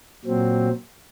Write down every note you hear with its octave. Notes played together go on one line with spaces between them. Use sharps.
A#2 F#3 C4